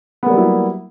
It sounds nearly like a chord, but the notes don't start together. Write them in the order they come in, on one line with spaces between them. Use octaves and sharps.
B3 A#3 G3 F#3 E4